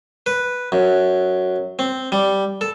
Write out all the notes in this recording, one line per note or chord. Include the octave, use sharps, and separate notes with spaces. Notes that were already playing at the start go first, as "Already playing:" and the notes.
B4
F#2
C4
G3
A4